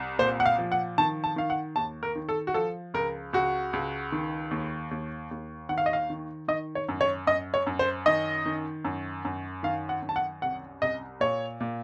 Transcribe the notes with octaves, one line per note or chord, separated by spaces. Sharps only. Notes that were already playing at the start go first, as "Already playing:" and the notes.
Already playing: C2
A#2 C5
F#5
F5
F3
F#5
D#3 A5
A5
D#3 F5
F#5
D#2 A5
A#4
D#3
A4
F#4
F3 A4
C#2 A#4
C#2 F#4
C#2
D#3
D#2
D#2
D#2
D#3 F#5
F5
D#5
F5
D#3
D#3 D#5
C#5
F#2
C#5
F#2 D#5
C#5
F#2
C5
D#3 D#5
D#3
F#2
F#2
D#3 F5
F#5
F#2
A5
F#5
C2 F#5
C2 D#5
A#2 C#5
A#2